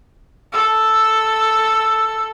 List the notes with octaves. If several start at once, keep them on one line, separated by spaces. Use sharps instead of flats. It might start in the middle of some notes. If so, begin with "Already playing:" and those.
A4 E6